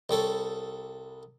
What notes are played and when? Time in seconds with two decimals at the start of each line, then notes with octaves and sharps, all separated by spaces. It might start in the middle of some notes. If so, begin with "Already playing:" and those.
0.09 C2 G3 A4 C#5